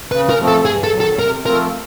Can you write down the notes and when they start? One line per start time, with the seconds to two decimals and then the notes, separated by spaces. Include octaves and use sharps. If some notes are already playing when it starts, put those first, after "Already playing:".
0.11 C#3 B4
0.30 A#4
0.39 F3 A3 C4
0.48 A4
0.65 G2 G#4
0.84 A4
0.92 D#3 F#3
1.00 A4
1.19 C3 A#4
1.45 F3 A3 C4 F4 A#4